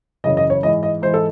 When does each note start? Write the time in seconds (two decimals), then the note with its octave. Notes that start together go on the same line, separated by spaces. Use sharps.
0.24 F#2 C#3 E3 D#5
0.37 D#5
0.50 C#5
0.63 G#2 E3 D#5
0.83 D#5
1.02 G#2 E3 C5
1.14 A4